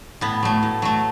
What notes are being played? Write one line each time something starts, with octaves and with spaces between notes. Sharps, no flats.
A2 B3
F#3 A3
A2
F#3 A3